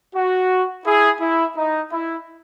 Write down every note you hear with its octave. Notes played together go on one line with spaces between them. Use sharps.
F#4
E4 G#4
E4
D#4
E4